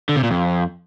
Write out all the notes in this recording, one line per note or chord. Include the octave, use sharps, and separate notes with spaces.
D3
C3
A#2
F2